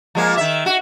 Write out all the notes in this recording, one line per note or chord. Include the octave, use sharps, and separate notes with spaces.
F3 G#3 A#3
D#3 E5
F#4